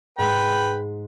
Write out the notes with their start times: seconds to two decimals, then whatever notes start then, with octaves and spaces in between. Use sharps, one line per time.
0.18 G#2 G#3 B4 G5 B5